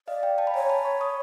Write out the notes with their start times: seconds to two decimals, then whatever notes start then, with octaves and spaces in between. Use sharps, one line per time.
0.08 D5 D#5 F5
0.23 F5 G5
0.38 G5 A5
0.47 B5
0.54 C#5 G#5 A#5
0.69 A5 B5
0.85 B5 C#6
1.01 C#6 D#6